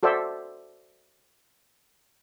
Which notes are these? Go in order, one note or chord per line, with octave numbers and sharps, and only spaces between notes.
F#4 A4 C5 D5 E5